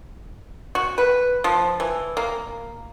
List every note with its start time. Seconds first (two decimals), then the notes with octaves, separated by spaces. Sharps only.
0.75 F#4
0.98 B4
1.44 F3
1.80 E3
2.17 A#3